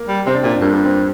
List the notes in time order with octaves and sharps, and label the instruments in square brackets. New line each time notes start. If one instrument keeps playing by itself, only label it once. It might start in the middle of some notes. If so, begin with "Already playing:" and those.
Already playing: [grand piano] A#3
[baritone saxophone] G3
[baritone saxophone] C3 [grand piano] C4
[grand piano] D4
[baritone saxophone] A#2 [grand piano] F4
[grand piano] D4
[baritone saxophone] G2 [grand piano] A#3
[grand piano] A#3
C4